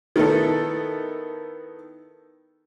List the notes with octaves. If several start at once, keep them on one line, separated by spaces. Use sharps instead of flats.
D#3 B3 D#4 E4 A4